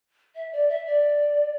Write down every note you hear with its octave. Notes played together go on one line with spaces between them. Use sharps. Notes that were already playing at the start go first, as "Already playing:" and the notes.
E5
D5
E5
D5